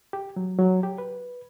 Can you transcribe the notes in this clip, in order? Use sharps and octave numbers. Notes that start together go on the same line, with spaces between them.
G4
F#3
F#3
G4
B4